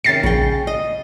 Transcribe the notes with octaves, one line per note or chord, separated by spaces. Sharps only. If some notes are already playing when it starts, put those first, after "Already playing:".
C3 D#3 C#4 A6 C7
A#1 C#3 G5
D#5